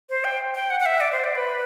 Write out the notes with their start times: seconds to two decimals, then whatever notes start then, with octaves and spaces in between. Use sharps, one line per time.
0.10 C5
0.24 G5
0.55 G5
0.70 F#5
0.80 F#5
0.86 E5
1.01 D5
1.12 C5
1.24 D5
1.35 B4